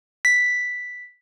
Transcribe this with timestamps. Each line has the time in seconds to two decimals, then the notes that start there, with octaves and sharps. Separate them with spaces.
0.25 B6